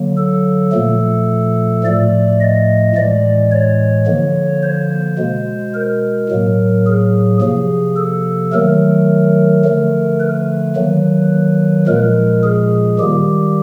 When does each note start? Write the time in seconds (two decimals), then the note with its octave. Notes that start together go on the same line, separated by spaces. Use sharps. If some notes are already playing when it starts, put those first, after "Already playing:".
Already playing: D3 F#3 A#3
0.18 A4
0.72 A#2 F3 A3
1.84 A2 F3 A3 D5
2.40 D#5
2.96 A2 E3 G#3 D5
3.51 C#5
4.07 D3 F3 A#3
4.63 C5
5.18 B2 G#3
5.74 A#4
6.29 A2 F#3 A#3
6.86 G#4
7.41 C3 F3 A#3 G#4
7.97 A4
8.52 D#3 F#3 A3 A#4
9.65 D3 F3 A3
10.20 B4
10.75 D#3 F#3 A#3
11.87 A#2 F3 G#3 A#4
12.43 G#4
12.99 D#3 G3 A#3 G4